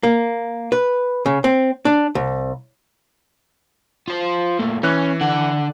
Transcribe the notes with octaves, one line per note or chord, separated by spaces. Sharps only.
A#3
B4
C#3
C4
D4
C2
F4 C5
A#2 A3
E3 C#4 F#6
D3 F#5